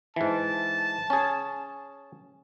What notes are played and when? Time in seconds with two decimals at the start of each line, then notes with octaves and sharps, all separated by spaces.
0.16 G#2 E3 A5
1.10 C#4 G#4